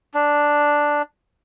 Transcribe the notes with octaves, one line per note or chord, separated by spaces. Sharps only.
D4